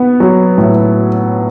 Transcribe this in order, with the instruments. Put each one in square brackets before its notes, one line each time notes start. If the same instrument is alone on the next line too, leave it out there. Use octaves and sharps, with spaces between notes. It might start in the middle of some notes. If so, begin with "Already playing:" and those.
Already playing: [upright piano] B3
F#3
A2